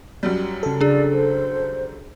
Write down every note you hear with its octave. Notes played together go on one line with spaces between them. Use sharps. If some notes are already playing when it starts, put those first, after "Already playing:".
F#2 F#3 G3
C#3 A4
D4 G#4 D5
C5